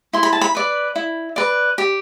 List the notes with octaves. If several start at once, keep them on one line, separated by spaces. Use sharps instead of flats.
E4 C6
B5
A5
B5
B4 D5
E4
B4 D5
G4